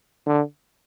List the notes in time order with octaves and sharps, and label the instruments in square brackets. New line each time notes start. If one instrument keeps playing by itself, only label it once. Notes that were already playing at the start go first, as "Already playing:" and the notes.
[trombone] D3